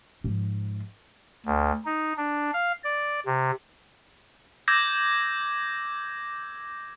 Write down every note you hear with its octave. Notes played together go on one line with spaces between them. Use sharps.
G#2 F3
D2
D#4
D4
F5
D5
C3
D6 E6 G6 G#6 A#6